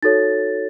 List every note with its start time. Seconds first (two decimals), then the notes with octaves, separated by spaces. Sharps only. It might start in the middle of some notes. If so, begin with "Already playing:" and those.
0.03 D#4 F#4 A4 C#5 A6